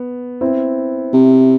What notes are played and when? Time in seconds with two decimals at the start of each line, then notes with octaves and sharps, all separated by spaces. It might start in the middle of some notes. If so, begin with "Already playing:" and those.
Already playing: B3
0.41 C4 E4
1.14 C3